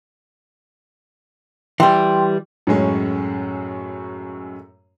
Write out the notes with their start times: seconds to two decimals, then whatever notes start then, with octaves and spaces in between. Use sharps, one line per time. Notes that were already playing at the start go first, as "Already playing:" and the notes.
1.80 E3 G3 G5 C6
2.67 F#2 A2 G#3 C#4